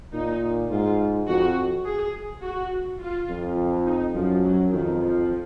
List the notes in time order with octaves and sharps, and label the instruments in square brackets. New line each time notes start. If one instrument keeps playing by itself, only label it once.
[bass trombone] A#2 [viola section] D#4
[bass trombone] G#2 [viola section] F4
[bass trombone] F2 [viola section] F#4
[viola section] G#4
F#4
F4
[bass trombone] F2
[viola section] D#4
[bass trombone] F#2 [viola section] F3
[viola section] F#3
[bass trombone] F2 [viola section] D#3
[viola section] F3